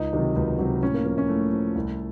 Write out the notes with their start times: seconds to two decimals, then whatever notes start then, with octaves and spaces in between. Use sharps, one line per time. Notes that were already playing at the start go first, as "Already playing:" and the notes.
Already playing: C#2 D#4
0.13 C3 D#3 F#3
0.36 C#2
0.58 C3 D#3 F#3
0.82 A2 C#4
0.94 A#3
1.05 F3 A#3
1.18 C#4
1.29 A2 A3
1.53 F3
1.75 C2